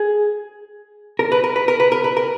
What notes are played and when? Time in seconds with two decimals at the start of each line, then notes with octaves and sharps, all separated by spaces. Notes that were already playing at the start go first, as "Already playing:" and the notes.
Already playing: G#4
1.19 A#4
1.32 B4
1.44 A#4
1.56 B4
1.68 A#4
1.80 B4
1.92 A#4
2.04 B4
2.17 A#4